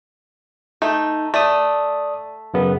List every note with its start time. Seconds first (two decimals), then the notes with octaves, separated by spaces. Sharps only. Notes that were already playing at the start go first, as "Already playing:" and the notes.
0.82 A3 D#4
1.34 A3 D5 D#6
2.54 F#2 C#3 B3